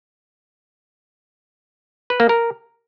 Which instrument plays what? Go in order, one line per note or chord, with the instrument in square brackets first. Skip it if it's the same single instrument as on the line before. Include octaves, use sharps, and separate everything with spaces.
[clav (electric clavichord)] B4
A#3
A#4